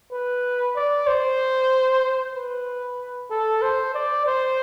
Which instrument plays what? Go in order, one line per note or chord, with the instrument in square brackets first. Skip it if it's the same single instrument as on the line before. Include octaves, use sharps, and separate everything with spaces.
[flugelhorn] B4
D5
C5
B4
A4
C5
D5
C5